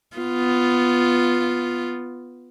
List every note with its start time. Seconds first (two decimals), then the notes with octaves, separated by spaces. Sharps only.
0.17 B3 F4